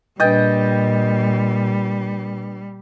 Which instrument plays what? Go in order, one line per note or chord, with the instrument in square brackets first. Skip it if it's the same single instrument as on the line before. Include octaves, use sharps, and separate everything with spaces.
[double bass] A#2 [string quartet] G3 [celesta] D4 B4 A6 [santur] D#5 G5